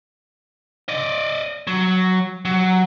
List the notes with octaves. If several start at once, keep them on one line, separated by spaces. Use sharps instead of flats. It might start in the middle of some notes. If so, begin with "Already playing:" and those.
D5 D#5
F#3
F#3